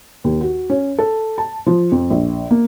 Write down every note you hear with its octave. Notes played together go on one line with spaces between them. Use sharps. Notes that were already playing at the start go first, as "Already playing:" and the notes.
D#2
F#4
C#4
A4
A5
F3
F2
A#1
A#3